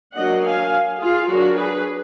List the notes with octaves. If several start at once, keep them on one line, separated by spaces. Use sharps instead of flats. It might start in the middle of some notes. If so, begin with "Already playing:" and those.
F#3 A#3 D4 D#5 F#5
F5 G#5
F4 G#4
F#3 D4 F#4 A#4
G#4 B4